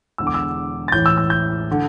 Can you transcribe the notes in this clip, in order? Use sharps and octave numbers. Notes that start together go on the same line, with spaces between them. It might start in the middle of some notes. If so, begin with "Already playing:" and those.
E1 E2 D3 E6
D6
E6
A6
A1 A2 E3 G6
E6
E6
G6
D3